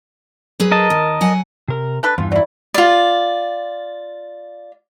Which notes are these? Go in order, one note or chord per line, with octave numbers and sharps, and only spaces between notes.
F#3 G#4 B4
A#4 D#5 A5
D#2
F#3 F#5 G#5
C3 A#4
D4 A4 B4
E2 G2 E3 F4
F#3 E4 D5
F4 D5